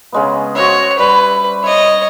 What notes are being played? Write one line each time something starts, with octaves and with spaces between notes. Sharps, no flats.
C#3 G#3 B3
F#4 C5 C#5 E5
G3 B4
C#5 D#5 E5